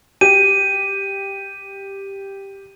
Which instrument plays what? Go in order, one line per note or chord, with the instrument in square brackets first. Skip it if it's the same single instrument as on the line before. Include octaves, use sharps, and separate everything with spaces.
[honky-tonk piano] G4 [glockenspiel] D#7